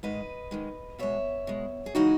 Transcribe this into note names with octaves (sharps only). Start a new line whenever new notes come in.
G#2 D#3 G#3 B4 D#5
G#2 D#3 G#3
B2 G#3 C#5 E5
B2 G#3
G#4
C#3 E3 G#3 D#4 F#4